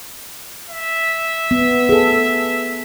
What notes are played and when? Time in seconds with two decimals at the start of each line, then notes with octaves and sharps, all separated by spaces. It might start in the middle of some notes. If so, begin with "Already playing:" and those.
0.69 E5
1.51 B3
1.89 G#4 A4